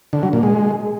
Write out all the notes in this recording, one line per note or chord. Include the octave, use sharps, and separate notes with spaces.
D3
F#3
A#2
G#3